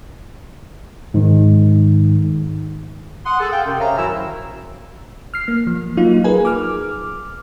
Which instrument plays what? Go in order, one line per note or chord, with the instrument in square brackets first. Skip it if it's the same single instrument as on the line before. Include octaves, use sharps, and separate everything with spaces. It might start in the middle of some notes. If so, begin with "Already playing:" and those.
[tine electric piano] G#2 D#3
[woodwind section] F#5 C6 D#6
G#4 A4
F5 G5
F#2 C3
C5 C#5 E5 F5 G#5 A#5
F#2 D#3 F#3 E4 F#4 E6
[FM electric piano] F6 C7
A#3
F3
F#3 A#3 D#4 F4
G#4 A#4 B4 G#5
D6 F6